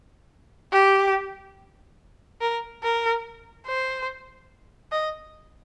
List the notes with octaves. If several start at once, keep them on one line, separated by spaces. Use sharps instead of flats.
G4
A#4
A#4
C5
D#5